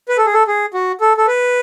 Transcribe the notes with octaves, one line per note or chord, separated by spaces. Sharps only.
B4
A4
G#4
A4
G#4
F#4
A4
A4
B4